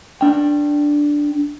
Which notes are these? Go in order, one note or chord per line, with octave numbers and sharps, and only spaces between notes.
D4 G5